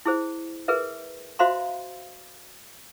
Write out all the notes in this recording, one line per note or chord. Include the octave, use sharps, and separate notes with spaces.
E4 G#4 C5
G#4 A#4 B4 E5
F#4 C5 E5 F5 A#5 C6